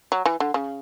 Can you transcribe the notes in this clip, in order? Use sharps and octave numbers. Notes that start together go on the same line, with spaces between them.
F#3
E3
D3
C#3